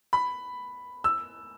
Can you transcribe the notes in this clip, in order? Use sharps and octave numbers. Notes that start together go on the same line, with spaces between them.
B5
E6